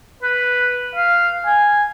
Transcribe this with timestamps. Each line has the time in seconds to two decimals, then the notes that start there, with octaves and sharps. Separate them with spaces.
0.23 B4
0.96 F5
1.46 G#5